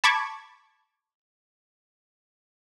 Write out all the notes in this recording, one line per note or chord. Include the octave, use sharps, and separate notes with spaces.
A5 B5 C#6 D6 G#6